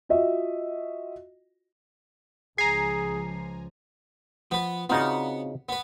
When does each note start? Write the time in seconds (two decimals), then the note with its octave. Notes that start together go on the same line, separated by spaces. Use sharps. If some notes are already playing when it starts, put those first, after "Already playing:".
0.09 F4 F#4 D#5 E5
2.58 C#2 F3 G#4 G#5 A#5 C7
4.51 F3 B3 B4
4.90 C#3 B3 C4 D#4 F4 F#4 D5 F#5
5.69 B3 B4